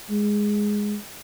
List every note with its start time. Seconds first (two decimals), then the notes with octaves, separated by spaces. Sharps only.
0.10 G#3